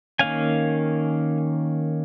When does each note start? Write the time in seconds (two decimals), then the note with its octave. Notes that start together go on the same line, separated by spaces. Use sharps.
0.19 D#3 A#3 C#4 F5 G#5